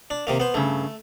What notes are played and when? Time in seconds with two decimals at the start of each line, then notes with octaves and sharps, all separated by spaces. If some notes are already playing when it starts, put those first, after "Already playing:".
0.10 D4
0.27 C3 D#3 A#3
0.40 B3 C5
0.54 G2 C#3 A3